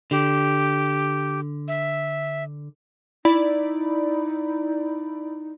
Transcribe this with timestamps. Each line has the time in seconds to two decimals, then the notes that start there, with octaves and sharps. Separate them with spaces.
0.11 D3 G4
1.68 E5
3.25 D#4 E4 D5 B5